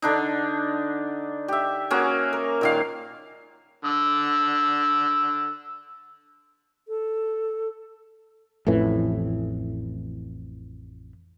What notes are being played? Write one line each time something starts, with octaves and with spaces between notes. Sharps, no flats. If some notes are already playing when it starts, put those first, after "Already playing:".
D3 D4 D#4
G4 E5
A#3 C#4 F#4 G#4
A#4
A#2 D#3 F5
D3 E6
A4
A1 F2 A2 E3